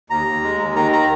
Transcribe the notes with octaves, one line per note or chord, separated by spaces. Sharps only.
D#2 A#5
D#2
G#3
D#2
D#3 A#5
A#5